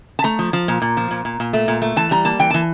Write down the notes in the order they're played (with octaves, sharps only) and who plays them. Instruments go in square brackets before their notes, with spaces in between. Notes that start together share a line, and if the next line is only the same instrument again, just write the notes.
[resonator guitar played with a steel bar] A5
A3 A#5
F3
F3
A#2
A#2
F3
A#2
A#2
A#2
A3
A#2
A3
E3 A5
G3 A#5
A#3 A5
E3 G5
E3 A5